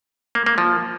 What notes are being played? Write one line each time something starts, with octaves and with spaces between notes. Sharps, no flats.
A#3
A#3
F3